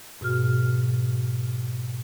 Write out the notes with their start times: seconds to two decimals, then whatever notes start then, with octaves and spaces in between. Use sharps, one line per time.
0.21 G#2 B2 F#4 F6